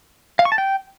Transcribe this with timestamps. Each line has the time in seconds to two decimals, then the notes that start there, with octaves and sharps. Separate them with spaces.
0.39 F5
0.45 C#6
0.52 A5
0.58 G5